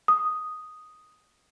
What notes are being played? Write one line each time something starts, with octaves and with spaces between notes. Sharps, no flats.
D#6